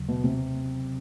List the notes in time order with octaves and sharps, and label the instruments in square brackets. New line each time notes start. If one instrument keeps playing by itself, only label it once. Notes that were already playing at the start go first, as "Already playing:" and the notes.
Already playing: [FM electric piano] D#2 C#3 F#3
[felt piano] B2
C3